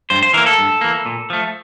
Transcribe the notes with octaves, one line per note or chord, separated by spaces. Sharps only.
G2 C5
C5
E3 A#3 A#4
A4
G2
E3 A#3
A#2
F3 A3